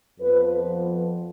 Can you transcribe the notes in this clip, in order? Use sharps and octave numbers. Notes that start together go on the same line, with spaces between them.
F2 F3 B3 B4